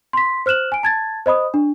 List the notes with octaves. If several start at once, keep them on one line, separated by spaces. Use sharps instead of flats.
C6 B6
C5 F6 F#6 E7 F#7
G#5 D7
A5 G#6 A6
C5 D#5 B5 D#6
D4